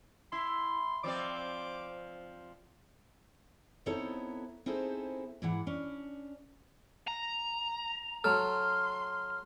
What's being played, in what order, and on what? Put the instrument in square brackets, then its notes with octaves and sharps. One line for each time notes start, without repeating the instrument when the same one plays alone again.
[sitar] E4 [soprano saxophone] C6
[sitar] F3 C4 D5 [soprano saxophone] D6
[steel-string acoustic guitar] B3 C4 D#4 E4 A4 C#5
C4 D#4 E4 G#4 A4 C5
G#2 E3 E4 F#5
C#4 D4
[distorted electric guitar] A#5
[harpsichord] F#3 A4 [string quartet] C6 [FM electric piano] F6